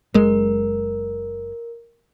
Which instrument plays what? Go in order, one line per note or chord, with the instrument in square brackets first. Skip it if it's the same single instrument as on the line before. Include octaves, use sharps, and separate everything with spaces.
[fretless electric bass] F#1 G#3 [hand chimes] A#4